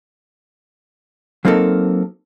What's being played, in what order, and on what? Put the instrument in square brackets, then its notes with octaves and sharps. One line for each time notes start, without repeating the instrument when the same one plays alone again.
[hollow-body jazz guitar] F#3 A#3 C4 D#4 A4 A#4